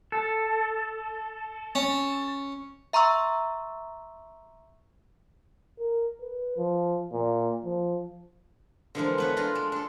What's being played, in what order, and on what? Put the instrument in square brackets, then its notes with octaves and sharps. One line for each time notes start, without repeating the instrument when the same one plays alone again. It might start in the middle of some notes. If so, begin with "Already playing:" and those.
[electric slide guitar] A4
[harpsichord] C#4
[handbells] E5 A#5 C6 C#6 E6
[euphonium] A#4
B4
F3
A#2
F3
[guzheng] D3 E3 F3 G#3 A#3 D4
B3 B4 C#5
D4 F4 D5 A#5 C6
G#3
D4 A4